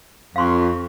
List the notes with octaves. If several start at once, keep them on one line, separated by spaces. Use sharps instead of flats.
F2 F5 C6 C#6